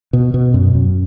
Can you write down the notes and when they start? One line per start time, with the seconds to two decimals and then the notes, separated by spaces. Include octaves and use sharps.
0.13 B2
0.34 B2
0.54 F#2
0.75 F#2